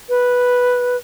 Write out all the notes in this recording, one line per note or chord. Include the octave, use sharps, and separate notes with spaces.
B4